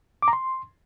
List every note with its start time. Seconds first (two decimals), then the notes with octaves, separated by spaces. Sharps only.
0.22 D6
0.28 A#5
0.33 C6